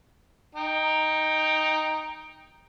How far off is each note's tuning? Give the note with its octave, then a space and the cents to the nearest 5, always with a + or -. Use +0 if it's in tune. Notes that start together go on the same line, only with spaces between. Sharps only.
D#4 +0 G5 +10